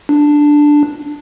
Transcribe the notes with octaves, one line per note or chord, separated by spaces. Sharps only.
D4